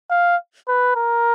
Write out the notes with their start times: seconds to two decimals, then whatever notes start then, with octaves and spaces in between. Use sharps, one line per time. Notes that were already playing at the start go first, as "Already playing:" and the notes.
0.11 F5
0.68 B4
0.96 A#4